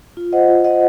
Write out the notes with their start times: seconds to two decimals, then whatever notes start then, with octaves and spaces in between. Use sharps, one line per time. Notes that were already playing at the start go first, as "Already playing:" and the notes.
0.17 F4
0.33 C5 D#5 F#5
0.48 F4
0.64 C5 D#5 F#5